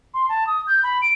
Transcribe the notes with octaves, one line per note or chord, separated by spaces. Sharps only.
C6
A5
D#6
G6
B5
D7